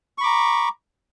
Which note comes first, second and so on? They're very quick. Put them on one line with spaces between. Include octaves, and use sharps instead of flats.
C#6 B5 D6 A#5